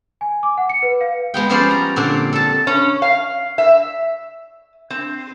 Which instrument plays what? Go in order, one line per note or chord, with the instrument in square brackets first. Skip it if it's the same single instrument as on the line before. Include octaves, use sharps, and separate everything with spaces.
[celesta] G#5
D6
F#5
C#7
B4
F5
[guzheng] G#3 B3 G5
F3 G3 B3 C#4 C5 D5
A#5
A#2 D3 C4 D4
A4 A5
[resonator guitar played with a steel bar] C#4
F5
E5
C4